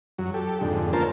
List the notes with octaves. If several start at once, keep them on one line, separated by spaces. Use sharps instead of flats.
F#2 F#3
G4 A4
F2 G#2 D3
A#3 C#4 F4 A#4 C5 A5